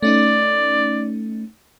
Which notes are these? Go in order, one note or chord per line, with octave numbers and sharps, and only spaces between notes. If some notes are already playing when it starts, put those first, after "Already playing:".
A3 C#4 D#4 D5